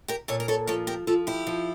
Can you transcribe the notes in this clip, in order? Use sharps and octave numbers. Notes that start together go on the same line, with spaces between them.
G4 A#4
A#2 A4 C#5
A#4
A4 C#5
F3 A4 C#5
G4 A#4
F3 F4 A4
E4 G4
F3